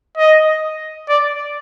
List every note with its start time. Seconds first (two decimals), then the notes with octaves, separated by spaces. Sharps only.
0.18 D#5
1.09 D5